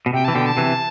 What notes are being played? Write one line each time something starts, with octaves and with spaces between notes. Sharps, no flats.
B2
C3 G5
E3 A5
B2 D3 G5
A5
C3 E3